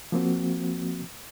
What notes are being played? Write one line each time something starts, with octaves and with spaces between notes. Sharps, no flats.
F3 A#3 C4 F#4